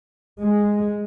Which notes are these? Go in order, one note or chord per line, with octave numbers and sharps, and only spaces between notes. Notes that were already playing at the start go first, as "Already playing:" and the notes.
G#3